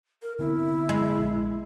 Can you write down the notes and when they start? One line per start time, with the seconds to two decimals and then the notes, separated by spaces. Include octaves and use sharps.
0.22 A#4
0.39 D3 B3 C4 E4
0.89 G#3
1.18 A#1